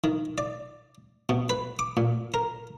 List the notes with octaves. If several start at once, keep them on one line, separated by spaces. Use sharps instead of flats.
D#3
D5
B2
B4
D6
A#2
A#4